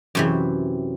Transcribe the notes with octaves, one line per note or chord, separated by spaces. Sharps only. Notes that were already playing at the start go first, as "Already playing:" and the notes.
F#2 C3 E3